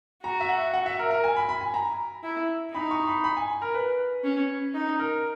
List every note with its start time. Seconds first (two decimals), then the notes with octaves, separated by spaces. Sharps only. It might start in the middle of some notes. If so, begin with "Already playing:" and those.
0.23 F#4 A#5
0.40 E5
0.49 F#5
0.74 F#5
0.86 E5
0.99 A#4
1.11 A#4
1.24 G#5
1.36 B5
1.49 B5
1.61 G#5
1.74 A#5
2.23 E4
2.74 D#4 B5
2.91 C#6
3.07 B5
3.24 B5
3.37 G#5
3.62 A#4
3.74 B4
4.24 C#4
4.74 D#4
4.99 A#4